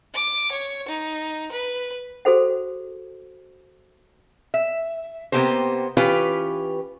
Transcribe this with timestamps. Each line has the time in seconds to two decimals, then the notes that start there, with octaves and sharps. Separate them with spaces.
0.14 D6
0.52 C#5
0.88 D#4
1.52 B4
2.25 F#4 G#4 A4 C5 F#5
4.54 E5
5.32 C3 A#3 B3 G4 C5
5.97 E3 C#4 F4 G4 B4